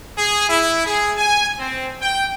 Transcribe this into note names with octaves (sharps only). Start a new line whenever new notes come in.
G#4
E4
G#4
G#5
C4
G5